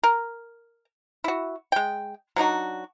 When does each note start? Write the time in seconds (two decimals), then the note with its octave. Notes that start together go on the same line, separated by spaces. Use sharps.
0.03 A#4
1.24 E4 F#4
1.72 G#3 G5
2.36 F#3 D4 D#4 F#4